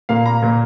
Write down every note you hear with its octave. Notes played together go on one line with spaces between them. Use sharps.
A#2 A#3 F5
A#5
A#2 A#3